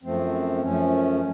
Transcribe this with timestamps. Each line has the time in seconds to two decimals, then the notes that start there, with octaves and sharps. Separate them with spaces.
0.03 F#2 F3 A3 C4
0.63 F#2 F3 A3 C#4